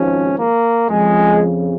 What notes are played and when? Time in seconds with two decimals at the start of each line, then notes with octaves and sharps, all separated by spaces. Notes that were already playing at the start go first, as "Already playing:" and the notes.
Already playing: G#1 G#2 F3 C#4
0.39 A#3
0.90 F2 C#3 F3 G#3